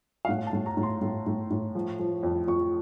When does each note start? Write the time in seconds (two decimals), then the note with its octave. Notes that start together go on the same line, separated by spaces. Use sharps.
0.25 F5
0.28 A2 F#5
0.47 A5
0.53 A2
0.66 A#5
0.77 A2
0.83 C6
1.01 A2
1.26 A2
1.51 A2
1.75 F3
1.99 F3
2.23 F2
2.47 F2 C#6